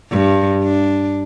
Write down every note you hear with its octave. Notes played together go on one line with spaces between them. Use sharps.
G2
D4